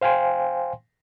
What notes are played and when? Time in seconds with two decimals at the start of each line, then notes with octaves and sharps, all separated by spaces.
0.01 C5 F5 G5 G#5 C6